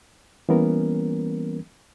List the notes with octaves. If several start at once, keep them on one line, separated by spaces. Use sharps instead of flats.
E3 G3 A#3 B3 C#4 A#4